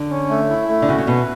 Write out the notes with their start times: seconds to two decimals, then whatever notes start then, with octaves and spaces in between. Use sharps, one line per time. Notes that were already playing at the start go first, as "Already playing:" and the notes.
Already playing: D3
0.10 C#4
0.29 A3
0.49 E4
0.69 A3
0.82 D3
0.88 C#3 F#4
0.98 C#3
1.07 B2 B4